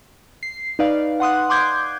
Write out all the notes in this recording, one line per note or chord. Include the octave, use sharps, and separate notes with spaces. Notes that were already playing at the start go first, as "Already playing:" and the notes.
C7
D#4 B4 D5 F5
F#5 C6 D#6 F#6
C6 D6 G6 G#6